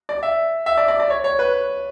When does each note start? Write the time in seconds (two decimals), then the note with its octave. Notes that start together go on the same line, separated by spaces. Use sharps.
0.09 D5
0.23 E5
0.66 E5
0.78 D5
0.88 D5
1.00 D5
1.10 C#5
1.24 C#5
1.39 B4